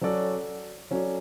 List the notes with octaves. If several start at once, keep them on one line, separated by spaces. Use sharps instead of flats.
F#3 C#4 F#4 A4 D5
F#3 C#4 F#4 A4 D5